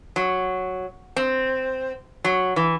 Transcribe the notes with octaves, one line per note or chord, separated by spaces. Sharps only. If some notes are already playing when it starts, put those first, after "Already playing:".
F#3
C4
F#3
E3